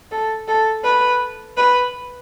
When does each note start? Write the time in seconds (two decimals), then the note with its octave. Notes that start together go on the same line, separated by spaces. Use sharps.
0.11 A4
0.48 A4
0.84 B4
1.57 B4